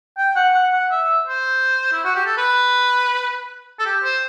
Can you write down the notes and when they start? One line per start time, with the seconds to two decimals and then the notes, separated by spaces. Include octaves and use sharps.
0.17 G5
0.36 F#5
0.54 F#5
0.73 F#5
0.91 E5
1.28 C5
1.92 E4
2.05 F#4
2.15 G4
2.26 A4
2.37 B4
3.79 A4
3.86 G4
4.04 C5